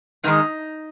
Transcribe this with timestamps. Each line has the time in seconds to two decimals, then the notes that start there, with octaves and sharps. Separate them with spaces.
0.24 G#2 D#3 G#3 D#4